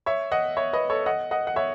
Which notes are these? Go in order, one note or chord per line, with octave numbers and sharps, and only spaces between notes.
C#5 E5
D#5 F#5
C#5 E5
B4 D#5
A4 C#5
D#5 F#5
D#5 F#5
F#5
C#5 E5